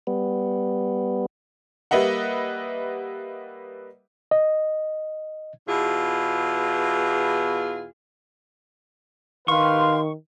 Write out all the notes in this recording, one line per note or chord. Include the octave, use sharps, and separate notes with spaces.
G3 B3
G3 A#3 B4 D#5 E5 F#5
D#5
E2 B2 E4 F4 G#4
D#3 G4 B4 F5 C6 C#6